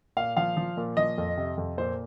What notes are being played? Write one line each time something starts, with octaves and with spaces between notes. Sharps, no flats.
A#2 F5
F3 F5
F3
A#2
F3 D#5
F2
C3
F2
A#2 C5